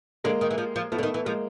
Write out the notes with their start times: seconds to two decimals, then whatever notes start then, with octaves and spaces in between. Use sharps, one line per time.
0.24 D3 G#3 A#3
0.41 D#3
0.51 E3
0.58 F3
0.76 F3
0.92 F3 A3 B3
0.99 D3
1.03 D#3
1.14 E3
1.25 F3 G#3 A#3